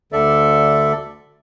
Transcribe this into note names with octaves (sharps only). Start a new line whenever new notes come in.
D2 D3 A4 D5 E5